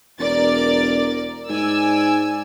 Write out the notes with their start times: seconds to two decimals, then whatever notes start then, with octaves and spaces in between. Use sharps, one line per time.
0.19 E1 A#4 D5 A6
1.50 G#2 D5 G#5 E6